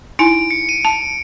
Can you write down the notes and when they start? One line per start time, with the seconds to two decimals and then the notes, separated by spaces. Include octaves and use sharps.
0.19 D#4 E4 G#5 D7
0.51 C#7
0.69 D#7
0.85 A5